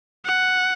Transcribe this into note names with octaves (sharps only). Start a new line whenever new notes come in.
F#5